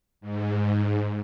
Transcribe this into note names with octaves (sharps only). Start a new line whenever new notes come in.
G#2